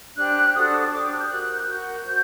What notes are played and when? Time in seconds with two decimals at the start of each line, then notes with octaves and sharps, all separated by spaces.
0.16 D4 G4 C5 F#6
0.54 D4 F#4 A4 C5 D#6
0.91 D4 G4 C5 D6
1.02 D#6
1.11 F#6
1.20 G6
1.29 F#4 A#4 F#6
1.42 F#6
1.54 G6
1.67 F#4 A#4 G6
2.04 F#4 C5